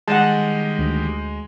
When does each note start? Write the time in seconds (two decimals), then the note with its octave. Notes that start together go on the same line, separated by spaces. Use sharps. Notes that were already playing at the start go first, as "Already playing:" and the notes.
0.08 D#3 G3 G#3 G4 D#5 F#5 A5
0.79 D2